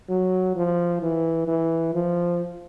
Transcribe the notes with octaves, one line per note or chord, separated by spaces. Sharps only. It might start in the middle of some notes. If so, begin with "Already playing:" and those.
F#3
F3
E3
E3
F3